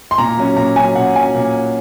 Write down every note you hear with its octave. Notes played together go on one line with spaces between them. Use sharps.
C6
A#2 A#5
F#3 C#4
A#2 A#5
F#3 C#4 G#5
A#2 F#5
F#3 C#4 G#5
A#2